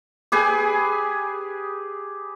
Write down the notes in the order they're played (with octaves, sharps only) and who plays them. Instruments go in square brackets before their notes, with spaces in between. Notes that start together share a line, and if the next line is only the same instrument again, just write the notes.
[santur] G4 G#4 B4 G#5